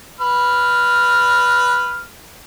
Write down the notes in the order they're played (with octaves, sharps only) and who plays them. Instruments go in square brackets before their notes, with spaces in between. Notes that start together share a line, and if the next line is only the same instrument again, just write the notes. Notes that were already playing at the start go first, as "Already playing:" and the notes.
[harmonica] B4 F6